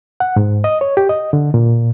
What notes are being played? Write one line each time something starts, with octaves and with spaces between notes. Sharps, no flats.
F#5
G#2
D#5
C#5
G4
D#5
D3
A#2